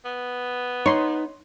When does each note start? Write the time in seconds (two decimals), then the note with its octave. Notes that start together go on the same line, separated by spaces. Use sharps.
0.05 B3
0.86 D#4 C#5 C6